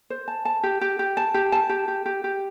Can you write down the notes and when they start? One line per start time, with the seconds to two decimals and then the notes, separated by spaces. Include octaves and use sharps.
0.10 C5
0.28 A5
0.45 A5
0.63 G4
0.81 G4
0.99 G4
1.17 A5
1.34 G4
1.52 A5
1.69 G4
1.88 G4
2.06 G4
2.24 G4